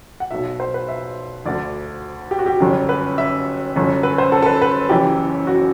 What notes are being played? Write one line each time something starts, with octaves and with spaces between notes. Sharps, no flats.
F#5
B1 B2 E5
C5
B4
E5
D2 D3 D5
G4
F#4
G4
G1 F#2 D3
B4
E5
G1 F#2 D3
B4
C5
A4
A4
B4
B4
F#1 F#2 E3 G4
F#4